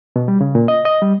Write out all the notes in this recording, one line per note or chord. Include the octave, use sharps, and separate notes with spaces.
B2
G3
C#3
A#2
D#5
D#5
G3